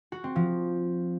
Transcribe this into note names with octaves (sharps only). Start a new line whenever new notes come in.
F#4
C4
F3